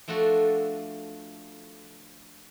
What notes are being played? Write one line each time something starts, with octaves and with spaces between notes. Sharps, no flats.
F3 A3 D4 F#4 A4